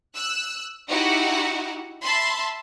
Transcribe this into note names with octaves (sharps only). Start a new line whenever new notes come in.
E6 F#6
D#4 E4 F#4 G4 F#5
E5 A5 B5 C6